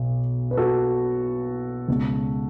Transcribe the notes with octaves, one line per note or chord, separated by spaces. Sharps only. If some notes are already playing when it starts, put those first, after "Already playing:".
Already playing: B1 B2
B4
F#4 A4
C#2 B2